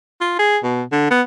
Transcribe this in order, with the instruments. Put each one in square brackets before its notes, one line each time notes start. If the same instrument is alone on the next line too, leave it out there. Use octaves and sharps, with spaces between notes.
[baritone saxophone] F4
G#4
B2
D3
B3